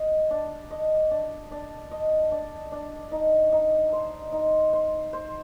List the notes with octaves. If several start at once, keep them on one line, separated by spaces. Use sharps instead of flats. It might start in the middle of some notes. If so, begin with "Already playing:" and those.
Already playing: D#5
D4
D#5
D4
D4
D#5
D4
D4
D#4
D#4
C5
D#4
C5
C5